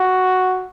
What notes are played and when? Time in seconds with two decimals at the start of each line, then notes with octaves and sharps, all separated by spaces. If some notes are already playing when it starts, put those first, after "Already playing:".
Already playing: F#4